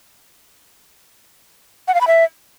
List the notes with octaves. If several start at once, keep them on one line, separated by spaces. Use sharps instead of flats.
F#5
F5
B5
E5